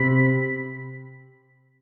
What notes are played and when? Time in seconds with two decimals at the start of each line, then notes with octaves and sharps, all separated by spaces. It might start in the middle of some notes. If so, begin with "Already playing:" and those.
Already playing: C3 C4 B5